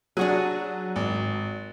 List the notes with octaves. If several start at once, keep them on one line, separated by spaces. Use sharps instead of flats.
F#3 D4 F#4 G#4
G#1